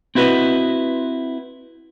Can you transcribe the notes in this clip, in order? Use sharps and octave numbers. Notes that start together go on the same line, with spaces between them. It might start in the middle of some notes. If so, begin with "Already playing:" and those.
C4 E4 F#4 B4 D#5